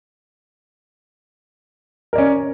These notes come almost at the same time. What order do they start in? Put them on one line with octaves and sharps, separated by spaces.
A#4 D5 C#4